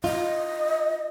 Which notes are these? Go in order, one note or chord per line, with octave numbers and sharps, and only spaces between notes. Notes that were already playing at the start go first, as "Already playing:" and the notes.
F4 D#5